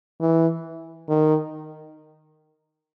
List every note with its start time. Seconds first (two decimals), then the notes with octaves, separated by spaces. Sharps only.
0.21 E3
1.09 D#3